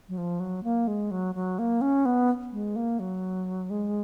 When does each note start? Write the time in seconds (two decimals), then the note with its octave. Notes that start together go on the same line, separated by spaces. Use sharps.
0.09 F#3
0.18 F3
0.40 F#3
0.64 A#3
0.88 G#3
1.11 F#3
1.35 F#3
1.59 A#3
1.81 C#4
2.06 B3
2.52 G#3
2.76 A#3
3.00 F#3
3.70 G#3